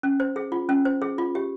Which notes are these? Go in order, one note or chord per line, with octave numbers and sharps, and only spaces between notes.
C#4
C5
G#4
F4
C#4
C5
G#4
F4
G4